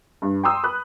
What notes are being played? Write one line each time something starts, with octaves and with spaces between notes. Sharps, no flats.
G2
G5 A#5 C6 D#6 E6
B5 D#6 F#6